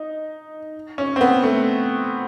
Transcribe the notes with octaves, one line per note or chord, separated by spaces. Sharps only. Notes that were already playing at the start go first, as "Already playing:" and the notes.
Already playing: D#4
C#4
C4
B3
A3